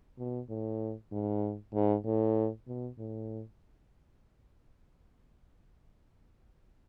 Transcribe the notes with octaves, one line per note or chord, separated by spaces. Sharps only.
B2
A2
G#2
G#2
A2
B2
A2